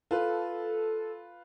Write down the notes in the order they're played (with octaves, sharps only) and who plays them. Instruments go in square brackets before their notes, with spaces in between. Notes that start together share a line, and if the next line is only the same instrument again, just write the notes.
[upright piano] F4 B4 [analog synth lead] A4